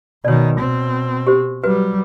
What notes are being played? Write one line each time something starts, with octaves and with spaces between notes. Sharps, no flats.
B2 D#3 C#5 D5
B2 C4
G4 C5
F#3 G3 B4